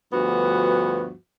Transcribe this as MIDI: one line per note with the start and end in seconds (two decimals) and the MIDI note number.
0.13 1.14 38
0.13 1.14 43
0.13 1.14 53
0.13 1.14 59
0.13 1.14 66